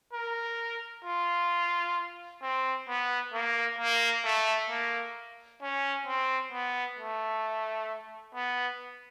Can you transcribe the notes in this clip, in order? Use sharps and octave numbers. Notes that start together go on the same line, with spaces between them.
A#4
F4
C4
B3
A#3
A#3
A3
A#3
C#4
C4
B3
A3
B3